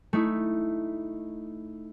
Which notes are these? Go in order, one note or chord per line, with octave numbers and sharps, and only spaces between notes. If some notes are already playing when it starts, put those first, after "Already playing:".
A3 D#4 E4